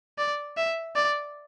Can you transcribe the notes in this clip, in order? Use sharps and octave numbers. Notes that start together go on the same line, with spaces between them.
D5
E5
D5